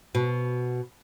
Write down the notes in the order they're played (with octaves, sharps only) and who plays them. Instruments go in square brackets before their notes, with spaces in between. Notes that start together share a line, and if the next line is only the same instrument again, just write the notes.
[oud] B2